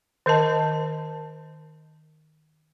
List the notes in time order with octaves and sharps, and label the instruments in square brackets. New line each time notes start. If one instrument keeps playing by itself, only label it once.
[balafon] D#3 A#4 D#5 A5